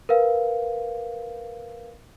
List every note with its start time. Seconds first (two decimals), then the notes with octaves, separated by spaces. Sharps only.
0.09 A#4 B4 F5